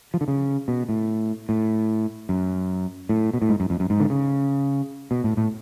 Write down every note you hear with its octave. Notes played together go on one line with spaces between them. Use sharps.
F3
D3
C#3
B2
A2
A2
F#2
A2
B2
A2
G#2
F#2
F2
F#2
G#2
D3
C#3
B2
A2
A2